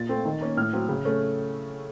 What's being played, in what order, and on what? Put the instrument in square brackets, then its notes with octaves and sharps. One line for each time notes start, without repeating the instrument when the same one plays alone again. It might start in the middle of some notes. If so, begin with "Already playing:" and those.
Already playing: [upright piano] A#2 A6
A3 C4
D#3
A#3 C#4
A2 F6
F#3 C4
C#3
A3 C#4